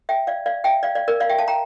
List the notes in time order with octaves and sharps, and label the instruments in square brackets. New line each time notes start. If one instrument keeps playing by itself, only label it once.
[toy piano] E5 G5
D5 F5
D5 F5
E5 G5
D5 F5
D5 F5
A#4 D5
D5 F5
E5 G5
F5 A5
G5 A#5